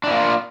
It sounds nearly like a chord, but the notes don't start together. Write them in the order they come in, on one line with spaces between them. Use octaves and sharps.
D4 E4 A#3 F4